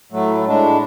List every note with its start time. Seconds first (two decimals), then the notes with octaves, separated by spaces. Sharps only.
0.12 A2 F#3 A3
0.45 A2 G#3 D4